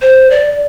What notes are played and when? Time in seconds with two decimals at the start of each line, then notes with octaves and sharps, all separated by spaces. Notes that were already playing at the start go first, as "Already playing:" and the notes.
0.02 C5
0.31 D5